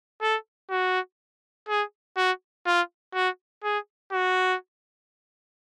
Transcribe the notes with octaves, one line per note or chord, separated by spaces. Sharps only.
A4
F#4
G#4
F#4
F4
F#4
G#4
F#4